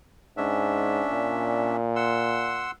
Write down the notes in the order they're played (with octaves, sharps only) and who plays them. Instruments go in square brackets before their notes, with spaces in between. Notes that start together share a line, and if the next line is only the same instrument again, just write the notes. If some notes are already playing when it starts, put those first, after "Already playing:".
[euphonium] G#2 [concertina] C#4 D4 E5
[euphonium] A#2
[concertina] F#5 C6 E6